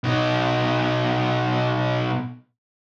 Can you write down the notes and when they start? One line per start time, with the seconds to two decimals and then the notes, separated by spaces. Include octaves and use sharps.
0.04 B2 D#4